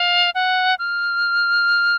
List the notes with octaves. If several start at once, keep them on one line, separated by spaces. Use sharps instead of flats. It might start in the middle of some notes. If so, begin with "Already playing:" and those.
Already playing: F5
F#5
F6